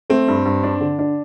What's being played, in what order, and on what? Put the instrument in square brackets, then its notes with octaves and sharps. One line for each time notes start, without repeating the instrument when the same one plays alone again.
[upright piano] A3 [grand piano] C4
[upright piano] G2
G2
D4
D3
D4